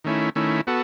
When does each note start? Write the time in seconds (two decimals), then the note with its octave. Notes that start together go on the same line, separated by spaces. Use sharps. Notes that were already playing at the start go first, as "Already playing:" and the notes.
0.04 D#3 A3 C#4 E4
0.35 D#3 A3 C#4 E4
0.67 B3 F#4 A4